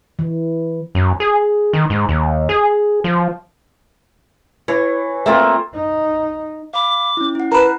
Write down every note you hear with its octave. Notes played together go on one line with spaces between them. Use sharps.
E3
F#2
G#4
D#3
G#2
D#2
G#4
F3
E3 C#5
A3 A#3 C4 F4
D#4
F5 B5 D6
C#4 E4
E4 F#5
A#4 B4 A5 A#5